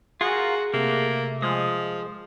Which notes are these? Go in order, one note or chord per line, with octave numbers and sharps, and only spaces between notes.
F4 F#4 G#4 A#4
C3 A3 A#3
F3 G#3 D#6